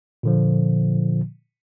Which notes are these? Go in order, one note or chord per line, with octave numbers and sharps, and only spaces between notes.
A#2 D3 F3